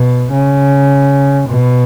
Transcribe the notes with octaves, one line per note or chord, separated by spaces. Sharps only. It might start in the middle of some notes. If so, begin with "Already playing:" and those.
Already playing: B2
C#3
B2